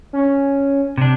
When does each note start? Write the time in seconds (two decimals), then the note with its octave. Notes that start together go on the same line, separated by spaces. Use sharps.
0.13 C#4
0.98 C3 D4